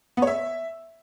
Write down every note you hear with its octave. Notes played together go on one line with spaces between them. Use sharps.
B3
C#5
E5